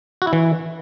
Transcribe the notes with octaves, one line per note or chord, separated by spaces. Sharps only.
F#4
E4
E3